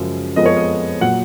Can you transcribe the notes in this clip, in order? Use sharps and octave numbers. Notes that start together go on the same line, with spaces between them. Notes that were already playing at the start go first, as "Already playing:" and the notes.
Already playing: F#2 C#3 F3 G#3
F2 F3 G#3 B3 D#5
C#5
D#5
A#2 F#3 F#5